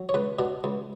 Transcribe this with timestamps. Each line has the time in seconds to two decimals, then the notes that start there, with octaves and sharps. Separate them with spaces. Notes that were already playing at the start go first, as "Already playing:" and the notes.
Already playing: F#3
0.09 C#5
0.14 C#2 B4
0.39 B2 D4
0.64 C#2